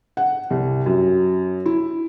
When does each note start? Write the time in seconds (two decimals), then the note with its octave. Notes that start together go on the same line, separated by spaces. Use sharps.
0.17 F#5
0.50 C2
0.86 F#2
1.66 E4